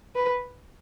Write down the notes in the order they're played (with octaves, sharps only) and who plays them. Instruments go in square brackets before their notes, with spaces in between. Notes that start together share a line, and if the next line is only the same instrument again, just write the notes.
[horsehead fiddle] B4